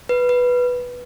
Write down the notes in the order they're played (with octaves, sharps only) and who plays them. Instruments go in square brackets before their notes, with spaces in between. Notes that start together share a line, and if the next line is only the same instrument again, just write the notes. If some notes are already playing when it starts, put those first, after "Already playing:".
[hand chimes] B4
B4